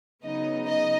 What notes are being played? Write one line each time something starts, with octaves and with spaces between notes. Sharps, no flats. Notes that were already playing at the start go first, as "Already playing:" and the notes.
C#3 F#3 B3 D#4 D#5
D#4 D#5